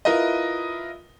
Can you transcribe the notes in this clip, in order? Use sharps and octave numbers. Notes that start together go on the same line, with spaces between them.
E4 F4 A#4 B4 D#5